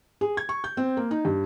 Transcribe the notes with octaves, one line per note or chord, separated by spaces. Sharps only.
G#4
G#6
C#6
G6
C4
A#3
D#4
G2